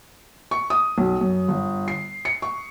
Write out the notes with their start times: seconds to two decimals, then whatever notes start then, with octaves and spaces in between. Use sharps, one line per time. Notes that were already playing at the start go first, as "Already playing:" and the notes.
0.51 C#6
0.70 D#6
0.98 B1
1.21 F#2
1.48 G1
1.88 C7
2.25 C#7
2.42 C#6